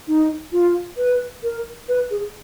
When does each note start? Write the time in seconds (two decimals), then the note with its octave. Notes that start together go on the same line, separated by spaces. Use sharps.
0.08 D#4
0.52 F4
0.97 B4
1.43 A#4
1.89 B4
2.10 G#4